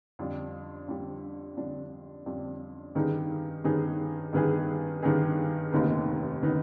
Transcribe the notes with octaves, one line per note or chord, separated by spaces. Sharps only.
F2 D3 G3 D4
F2 D3 G3 D4
F2 D3 G3 D4
F2 D3 G3 D4
G2 D#3 B3 D#4 G#4
G2 D#3 B3 D#4 G#4
G2 D#3 B3 D#4 G#4
G2 D#3 B3 D#4 G#4
F1 D#2 D#3 B3 D#4
D#3 B3 D#4